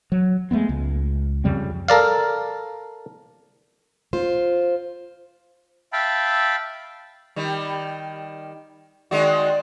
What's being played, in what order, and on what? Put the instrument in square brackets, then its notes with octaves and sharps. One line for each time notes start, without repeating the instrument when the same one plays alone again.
[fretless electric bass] F#3
G#3 A3 B3 C4
C#2
F2 C#3 G3 C4
[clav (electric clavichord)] A4 A#4 D5 F5
[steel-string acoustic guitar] F4 C5
[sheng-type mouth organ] E5 F5 G5 A5 B5
[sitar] D#3 G3
[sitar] D#3 G#3 F#4 [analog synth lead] D5